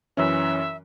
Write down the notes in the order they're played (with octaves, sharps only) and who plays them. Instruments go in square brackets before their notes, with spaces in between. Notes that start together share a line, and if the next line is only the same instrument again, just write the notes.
[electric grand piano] F#2 E3 C#4 [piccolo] E5